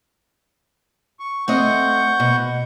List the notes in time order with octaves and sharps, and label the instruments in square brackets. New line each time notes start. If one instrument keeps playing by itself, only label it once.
[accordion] C#6
[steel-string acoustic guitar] A3 C4 D#5 [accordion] F#5 C#6 G6
[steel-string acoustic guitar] B2